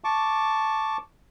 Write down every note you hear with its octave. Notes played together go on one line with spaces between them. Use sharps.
A5 C#6 D6